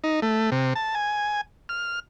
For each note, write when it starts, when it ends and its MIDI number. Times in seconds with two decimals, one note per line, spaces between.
0.04 0.20 63
0.22 0.50 57
0.52 0.74 48
0.75 0.95 81
0.95 1.41 80
1.69 2.00 89